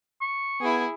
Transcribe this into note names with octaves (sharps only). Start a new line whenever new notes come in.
C#6
B3 E4 G#4